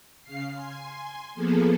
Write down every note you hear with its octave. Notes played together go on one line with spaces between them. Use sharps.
C#3 F5 C7
G#5 C6
F3 A#3 B3 G#4 A4